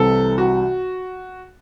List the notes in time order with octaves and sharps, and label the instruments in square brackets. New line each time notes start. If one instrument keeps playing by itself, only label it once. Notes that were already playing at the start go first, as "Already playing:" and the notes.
Already playing: [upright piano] C2 C3 E3 C4 [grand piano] A4
[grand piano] F#4